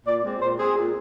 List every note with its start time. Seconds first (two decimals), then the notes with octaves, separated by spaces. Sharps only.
0.05 A#2 D5
0.22 G#3 C4
0.40 A#2 C5
0.58 G#3 C4 G#4
0.75 A#2